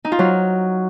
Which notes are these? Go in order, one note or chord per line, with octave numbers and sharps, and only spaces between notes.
D#4
F4
F#3